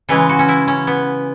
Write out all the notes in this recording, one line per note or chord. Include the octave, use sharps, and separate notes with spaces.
C#3 E3 G#3 B4
F#4
C#4
E4
C#4
B3